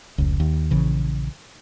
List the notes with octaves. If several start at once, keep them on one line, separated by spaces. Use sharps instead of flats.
F1 C#2
D#2
A#1 C#3 E3